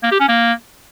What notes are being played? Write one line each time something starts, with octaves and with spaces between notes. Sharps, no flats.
A#3
G4
C#4
A#3